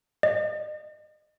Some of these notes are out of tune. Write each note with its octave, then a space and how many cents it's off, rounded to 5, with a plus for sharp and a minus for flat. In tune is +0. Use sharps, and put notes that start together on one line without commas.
D#5 -30